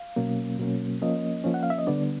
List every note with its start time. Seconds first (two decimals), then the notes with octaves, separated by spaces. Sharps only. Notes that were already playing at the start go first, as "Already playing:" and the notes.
Already playing: F5
0.16 B2 F#3 A#3 C#4
0.59 B2 F#3 A#3 C#4
1.02 F3 A#3 C#4 D#5
1.44 F3 A#3 C#4
1.54 F#5
1.63 F5
1.70 E5
1.78 D#5
1.87 D3 G3 B3 D4 D5